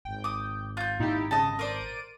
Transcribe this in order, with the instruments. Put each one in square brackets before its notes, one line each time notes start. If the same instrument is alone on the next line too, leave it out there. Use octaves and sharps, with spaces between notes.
[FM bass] G#1 [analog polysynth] G5
[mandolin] D6 D#6
F4 G6
[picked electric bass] A#2 [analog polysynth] D#4 E4 G4
[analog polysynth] C#3 [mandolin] D#5 A5
[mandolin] A#4 C5 [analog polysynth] D5 D7 D#7